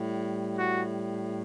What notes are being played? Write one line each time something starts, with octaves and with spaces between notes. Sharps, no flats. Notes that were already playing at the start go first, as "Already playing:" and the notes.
Already playing: A2 G3
F#4